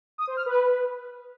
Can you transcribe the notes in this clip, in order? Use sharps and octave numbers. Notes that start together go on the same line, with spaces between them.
D#6
C5
F6
B4